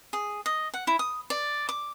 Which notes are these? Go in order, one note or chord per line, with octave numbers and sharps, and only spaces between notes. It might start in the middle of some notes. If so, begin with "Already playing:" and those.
G#4
D#5
F#5
E4
D#6
D5
D6